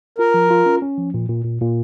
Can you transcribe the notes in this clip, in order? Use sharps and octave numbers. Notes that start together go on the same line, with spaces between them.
F4 A#4
F3
F4
C#4
C#4
F3
A#2
A#2
A#2
A#2